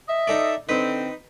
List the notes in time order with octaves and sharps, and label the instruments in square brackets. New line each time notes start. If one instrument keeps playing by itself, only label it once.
[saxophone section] D#5 E5
[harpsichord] D#4 A4 D5
[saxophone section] D3 C4 [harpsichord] D#4 B4